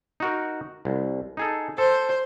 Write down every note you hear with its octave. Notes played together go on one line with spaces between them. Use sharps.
D#4 F#4 A#4
C2
D#4 G#4 A4
A4 C5